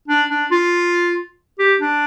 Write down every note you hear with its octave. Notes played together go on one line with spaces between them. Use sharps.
D4
D4
F4
G4
D4